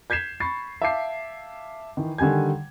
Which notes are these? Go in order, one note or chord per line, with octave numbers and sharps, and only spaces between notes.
G6 G#6 B6 C7 E7
B5 C#6 A6 C7
E5 F5 A5 D6 G6 C7
D#3 E3
D3 D#3 G3 G#5 G#6